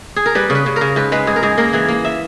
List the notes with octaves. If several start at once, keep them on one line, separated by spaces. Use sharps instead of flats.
G#4
A#4
G3 B4
C#3
B4
C#3
A#4
C#3
G#2 B4
G#3 B4
G#2 G#4
A#4
G#2 G#4
A#3 A#4
E3 G#4
A#3
E5